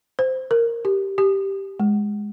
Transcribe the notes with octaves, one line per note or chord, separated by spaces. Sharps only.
C5
A#4
G4
G4
G#3